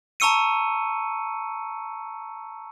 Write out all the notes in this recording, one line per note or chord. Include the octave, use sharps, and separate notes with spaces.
A5 A#5 C#6 E6 C#7 D#7